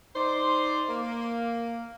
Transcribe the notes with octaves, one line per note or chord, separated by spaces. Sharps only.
D#4 C5 D5 C6
A#3